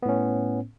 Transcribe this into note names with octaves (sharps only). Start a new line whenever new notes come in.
A2 B3 C#4